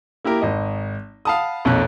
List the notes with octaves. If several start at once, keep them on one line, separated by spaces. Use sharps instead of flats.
A#3 E4 G4 A#4
G#1 D#5
F5 F#5 A5 B5 D#6
B1 F2 A#2 C#5 F#6